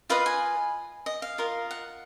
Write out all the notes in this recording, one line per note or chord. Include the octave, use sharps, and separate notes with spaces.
F4 B4 D#5 F5
G#5
D#5
F5
F4 A#4 D#5
F#5